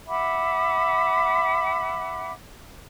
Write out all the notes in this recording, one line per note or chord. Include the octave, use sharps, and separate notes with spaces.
E5 F#5 B5 D6